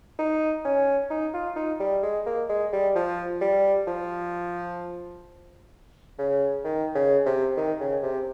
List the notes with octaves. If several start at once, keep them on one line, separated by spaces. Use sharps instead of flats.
D#4
C#4
D#4
F4
D#4
G3
G#3
A#3
G#3
G3
F3
G3
F3
C#3
D#3
C#3
C3
D#3
C#3
C3